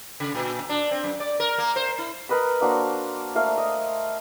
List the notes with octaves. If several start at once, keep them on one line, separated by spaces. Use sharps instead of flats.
C#3
A#2
D4
C4
F#2
D5
A#4
A#3
C5
E4
A#4 B4 D#5 B5
A#3 D4 F#4 C5
A3 A#4 F5
D#5